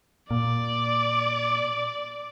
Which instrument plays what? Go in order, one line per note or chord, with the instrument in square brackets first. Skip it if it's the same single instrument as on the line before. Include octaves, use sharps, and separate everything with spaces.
[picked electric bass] A#2 [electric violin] D5